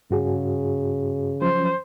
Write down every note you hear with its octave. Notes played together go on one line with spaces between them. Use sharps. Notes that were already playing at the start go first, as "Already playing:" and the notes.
G2 C#3 F#4 G#4
F3 F#3 C#4 C5